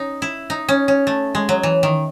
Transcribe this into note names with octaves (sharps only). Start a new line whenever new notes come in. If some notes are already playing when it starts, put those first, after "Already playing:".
Already playing: C#4 D#4
E4
D#4
C#4
C#4
A3
G#3
F#3
E3
D#3